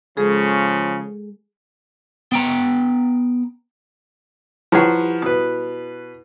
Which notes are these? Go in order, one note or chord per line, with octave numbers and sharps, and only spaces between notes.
C#3 F3 G#3 C#4 G#4 A4
B3 G5 A#5
F3 E4 G4 B4 C#5 F#5
B2 B4 D#6